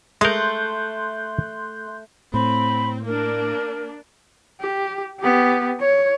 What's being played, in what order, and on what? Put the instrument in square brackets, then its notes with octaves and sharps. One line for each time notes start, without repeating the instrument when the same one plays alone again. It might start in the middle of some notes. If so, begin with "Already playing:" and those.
[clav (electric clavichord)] G#3 A#4 [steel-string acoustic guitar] A3 [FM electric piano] C6 F#6 G6
[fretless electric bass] A2 [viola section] C4 [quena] B5
[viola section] A#3 D4 [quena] A#4
[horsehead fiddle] G4
B3 G4
C#5